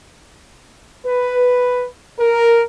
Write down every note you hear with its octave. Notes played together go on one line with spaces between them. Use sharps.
B4
A#4